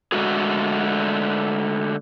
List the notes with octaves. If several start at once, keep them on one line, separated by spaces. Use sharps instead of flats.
D3 G#3 A3 F#4 G#4